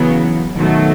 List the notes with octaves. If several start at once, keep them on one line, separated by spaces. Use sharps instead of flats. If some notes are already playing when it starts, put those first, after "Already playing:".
Already playing: C#3 E3 F#3 B3
B2 D#3 F#3 A3